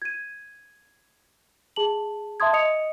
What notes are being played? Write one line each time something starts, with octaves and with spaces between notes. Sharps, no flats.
G#6 D#7
G#4 A5 F#7
E5 A5 C6 D#6 G#6
D#5 D#6 C#7 F7